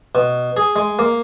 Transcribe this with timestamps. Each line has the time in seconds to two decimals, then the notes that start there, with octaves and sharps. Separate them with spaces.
0.15 B2
0.57 G#4
0.76 G#3
0.99 A#3